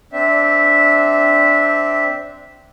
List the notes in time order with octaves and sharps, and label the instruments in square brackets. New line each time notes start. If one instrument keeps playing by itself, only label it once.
[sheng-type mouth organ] C4 D4 E5